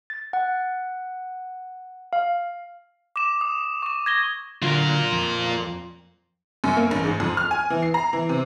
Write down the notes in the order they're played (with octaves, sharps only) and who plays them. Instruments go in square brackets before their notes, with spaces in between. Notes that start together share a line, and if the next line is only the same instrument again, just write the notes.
[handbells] A6
F#5
F5
[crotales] D6 E7
D#6
C#6 E7
G#6 A#6 G7
[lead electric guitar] D3 F#3 [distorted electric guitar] F4 A#4
[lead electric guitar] F2
[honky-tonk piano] F#2
A#3
A1
G#2
F2
F6
G#5
E3
C7
A#5
E3
C3